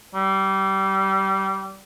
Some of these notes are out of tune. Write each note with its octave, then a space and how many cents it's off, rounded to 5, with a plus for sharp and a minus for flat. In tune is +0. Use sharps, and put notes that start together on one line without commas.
G3 -25